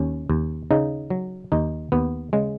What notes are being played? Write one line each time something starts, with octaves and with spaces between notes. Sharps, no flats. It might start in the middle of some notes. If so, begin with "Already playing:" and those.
Already playing: D#2 C#4
D#2
C#3 D#4
F#3
D#2 D#4
D#2 B3
C#3 G#3